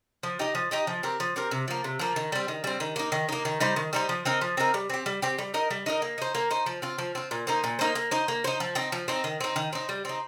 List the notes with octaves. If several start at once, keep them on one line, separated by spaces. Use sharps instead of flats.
F3
D#4 G4 D#5
F3
D#4 G4 D#5
F3
C4 G4 A#4
F3
C4 G4 A#4
C3
F3 A#3
C3
F3 A#3
D#3
G3 C4
D#3
G3 C4
D#3
A#3 D#4
D#3
A#3 D#4
D#3
G3 D#4 C5
D#3
G3 D#4 C5
F3
C4 D#4 A#4
F3
C4 D#4 A#4
G3
C4 G4
G3
C4 G4
G3
D#4 A#4 D#5
G3
D#4 A#4 D#5
A#3
D#4 C5
A#3
D#4 C5
F3
C4 F4
F3
C4 F4
A#2
A#3 D#4 C5
A#2
A#3 D#4 C5
A#3
D#4 C5
A#3
D#4 C5
F3
C4 D#4
F3
C4 D#4
D#3
C4 D#4
D#3
C4 D#4
G3
C4 D#4